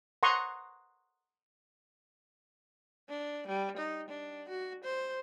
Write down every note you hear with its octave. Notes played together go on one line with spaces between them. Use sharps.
F#5 A#5 C6 C#6 D#6
D4
G3
D#4
D4
F#4
C5